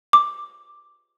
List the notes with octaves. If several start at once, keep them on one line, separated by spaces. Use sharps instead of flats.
D6